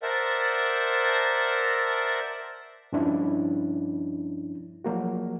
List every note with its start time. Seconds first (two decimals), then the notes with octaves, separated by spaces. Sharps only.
0.02 A#4 C5 D5 E5 F#5 A5
2.92 G2 F3 C#4 D4 E4
4.84 F3 F#3 A#3 F#4